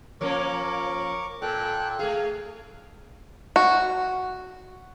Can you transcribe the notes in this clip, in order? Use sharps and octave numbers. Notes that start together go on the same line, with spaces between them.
F3 A#3 C#4 A#4 C#6 D6
A#2 A4 G5 F#6
A3 G#4 F5
F#4